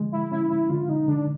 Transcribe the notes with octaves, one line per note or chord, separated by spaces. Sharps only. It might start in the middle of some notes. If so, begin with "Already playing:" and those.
Already playing: D3 F3 G#3
E4
C#4 E4
E4
D3 F4
D#4
D3 D4